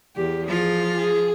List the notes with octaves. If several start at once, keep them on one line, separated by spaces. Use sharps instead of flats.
E2 G4
F3 F4 G#4
G#4